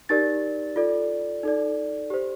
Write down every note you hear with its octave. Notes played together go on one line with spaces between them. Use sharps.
D#4 G4 A#4 D5 A6
F4 A4 D5
D#4 A4 D5
G4 C5